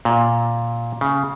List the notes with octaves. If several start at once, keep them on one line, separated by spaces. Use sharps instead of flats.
A#2
C#3